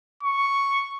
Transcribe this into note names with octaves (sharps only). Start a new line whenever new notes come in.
C#6